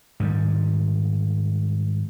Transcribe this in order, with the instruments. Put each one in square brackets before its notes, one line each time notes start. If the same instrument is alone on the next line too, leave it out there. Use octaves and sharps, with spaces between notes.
[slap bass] G#2 D#3 G3